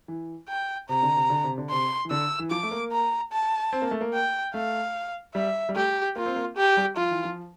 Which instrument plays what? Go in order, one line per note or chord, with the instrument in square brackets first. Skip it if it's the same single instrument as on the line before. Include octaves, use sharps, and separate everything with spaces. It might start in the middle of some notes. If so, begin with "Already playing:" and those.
[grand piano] E3
[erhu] G5
[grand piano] C3 [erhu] A#5
[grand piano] D3
C3
D3
C3
D3
[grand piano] C3 [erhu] C6
[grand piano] E3
[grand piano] D3 [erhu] E6
[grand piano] E3
[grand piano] F3 [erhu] D6
[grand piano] A3
A#3
[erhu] A#5
A5
[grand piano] C4
A#3
A3
A#3
[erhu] G5
[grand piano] A3 [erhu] F5
[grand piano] G3 [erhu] E5
[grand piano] G3
[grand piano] A3 [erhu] G4
[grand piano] A#3 [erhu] F4
[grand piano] C4
A#3
[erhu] G4
[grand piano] G3
[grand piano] F3 [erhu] F4
[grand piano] E3
F3